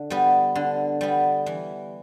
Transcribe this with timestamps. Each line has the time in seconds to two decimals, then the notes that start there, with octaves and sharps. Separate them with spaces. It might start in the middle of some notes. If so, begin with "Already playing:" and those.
Already playing: D3
0.10 G3 B3
0.55 D3
1.01 G3 B3
1.46 E3